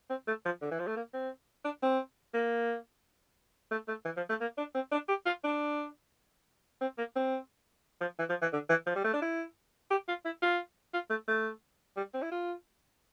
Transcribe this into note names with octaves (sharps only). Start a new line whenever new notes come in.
C4
A3
F3
D3
E3
F3
A3
A#3
C4
D4
C4
A#3
A3
A3
E3
F3
A3
A#3
D4
C4
D4
G4
F4
D4
C4
A#3
C4
F3
E3
F3
E3
D3
E3
F3
G3
A3
D4
E4
G4
F4
E4
F4
F4
A3
A3
G3
C4
E4
F4